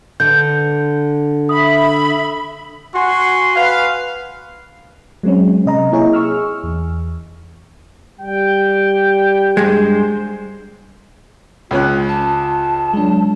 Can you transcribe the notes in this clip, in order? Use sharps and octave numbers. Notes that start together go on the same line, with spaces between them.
D3 G6
E5 B5 D#6
F#4 G#5 C6
B4 F5
F#3 G#3 C4 C#4
C3 D#5 A#5
A#3 E4 G#4 C#5 D#5
G#4 C#6 E6 F6
E2
G3 G5
G2 G#3 C5
C#2 C#4 F4 F#6
A5
F#3 G#3 D4